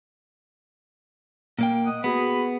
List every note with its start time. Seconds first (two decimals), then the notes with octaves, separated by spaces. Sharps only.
1.59 A#2 A#3 G5
1.85 D#5 F#5 D#6
2.04 B3 F#4 G#4 B5